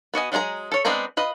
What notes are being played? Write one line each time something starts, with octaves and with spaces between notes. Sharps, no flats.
B3 F#4 D#5 G#5
F#3 G#3 F#4 G#4 A#5
A4 C#5
G#3 B3 C4 D4 A#5
F4 B4 D#5